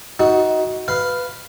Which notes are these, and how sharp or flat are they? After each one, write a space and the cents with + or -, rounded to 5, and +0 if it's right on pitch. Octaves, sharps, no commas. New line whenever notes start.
D#4 +20 F#4 +10
B4 +10 F5 +0